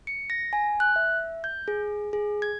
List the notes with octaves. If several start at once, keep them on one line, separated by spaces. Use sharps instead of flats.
C#7
A#6
G#5
F#6
E5
G6
G#4
G#4
G#6